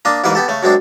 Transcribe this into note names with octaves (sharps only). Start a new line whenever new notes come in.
A#3 D4 D#5
A1 G#2 A#3 E4 B4 D6
B3 G4 A4
C#3 A3
F#2 G#3 C4 D4